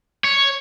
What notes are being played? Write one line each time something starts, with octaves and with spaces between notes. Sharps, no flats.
C#5